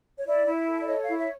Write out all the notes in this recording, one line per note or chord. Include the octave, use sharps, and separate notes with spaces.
C#5
E4 D5
E4
A4
D5
C#5 D#5
F5
E4
E5